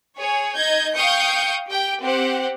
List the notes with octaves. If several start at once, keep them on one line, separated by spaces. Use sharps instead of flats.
G#4 C#5
D#4 D#5 G6 G#6
F5 G5 C#6 D#6 G6 C#7
G4 G5
C4 G4 C5 F#5